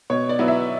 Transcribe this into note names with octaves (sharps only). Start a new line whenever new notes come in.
B2 C#5
D5
F#3 B3 E4
E5